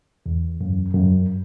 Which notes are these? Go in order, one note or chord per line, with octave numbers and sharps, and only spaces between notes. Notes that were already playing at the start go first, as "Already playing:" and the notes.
E2
F#2
F#2